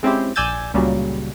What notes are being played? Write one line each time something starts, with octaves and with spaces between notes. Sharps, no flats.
G#3 C4 C#4 E4 G4
A#1 D5 G#5 E6 G6 A6
C#2 A#2 C#3 F#3 G3